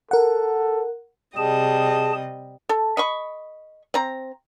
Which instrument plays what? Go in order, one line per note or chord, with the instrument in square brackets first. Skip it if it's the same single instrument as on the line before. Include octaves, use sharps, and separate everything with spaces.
[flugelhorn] A4 [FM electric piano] A#4 F#5
[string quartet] C3 G3 D#5 [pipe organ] G#4 A5
[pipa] A4
D#5 B5 C#6
C4 A#5